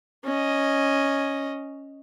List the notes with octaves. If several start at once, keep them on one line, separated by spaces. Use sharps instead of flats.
C#4 D#5